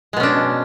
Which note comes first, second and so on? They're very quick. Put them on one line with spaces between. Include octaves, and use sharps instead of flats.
G#3 B2 C#4 D4